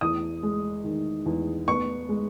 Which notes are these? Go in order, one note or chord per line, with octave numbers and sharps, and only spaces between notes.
E2 D#6
G#3
D#3
E2
B3 C#6
G#3